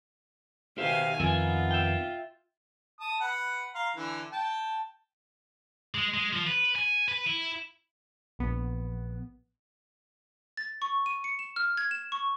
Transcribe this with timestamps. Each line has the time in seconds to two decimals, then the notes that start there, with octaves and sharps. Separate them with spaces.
0.78 B2 D#3 G4 C5 E5 F5 G#5
1.20 F2 D#3 B3 D#4 F4 E5 G#5
1.71 E5 G5
3.00 A5 D#6
3.21 B4 F#5
3.75 F5 A#5 C6
3.96 D3 E3
4.32 G5 A5
5.95 G#3
6.14 G#3
6.33 F3
6.47 B4
6.76 G#5
7.08 B4
7.26 E4
8.39 A#1 B3
10.57 A6
10.82 C#6
11.06 D#7
11.24 C#7
11.39 E7
11.56 F6
11.77 G#6
11.91 E7
12.12 C#6